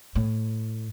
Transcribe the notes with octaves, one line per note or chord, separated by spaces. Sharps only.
A2